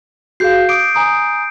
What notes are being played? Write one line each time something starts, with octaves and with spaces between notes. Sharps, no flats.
F#4 G#4 F5 G6 C7
D6 D#6 G6 C7 D7
G#5 A#5 D#6